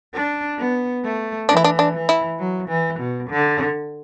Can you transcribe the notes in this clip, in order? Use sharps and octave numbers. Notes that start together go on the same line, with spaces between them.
D4
B3
A3
E3 D4
E4
D4
D4
E3
E4
F#3
E3
B2
D3